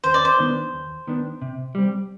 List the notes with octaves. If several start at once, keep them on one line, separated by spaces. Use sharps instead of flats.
D#2 C5
D5
C5
D#3 B3 D4
D#2
D#3 B3 D4
C3
G3 C4